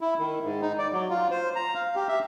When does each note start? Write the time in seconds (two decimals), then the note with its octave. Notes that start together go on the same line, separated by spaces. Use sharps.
0.01 E4
0.19 D#3
0.44 G#2
0.62 D#4
0.78 D5
0.93 F#3
1.10 F4
1.31 C5
1.56 A#5
1.75 F5
1.96 G4
2.08 E5